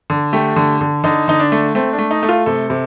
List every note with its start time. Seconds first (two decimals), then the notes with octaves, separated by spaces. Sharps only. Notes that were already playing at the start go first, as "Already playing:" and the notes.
0.10 D3
0.33 A3 G4
0.56 D3
0.81 D3
1.04 D3 D#4
1.28 D3 D#4
1.39 D4
1.52 A3
1.75 A3 C4
1.93 D4
1.99 A3
2.11 D#4
2.23 A3
2.29 F4
2.46 C3 A4
2.70 C3